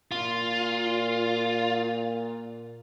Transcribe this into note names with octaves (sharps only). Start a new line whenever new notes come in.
A#2 F4